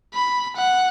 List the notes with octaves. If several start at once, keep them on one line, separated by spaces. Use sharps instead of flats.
B5
F#5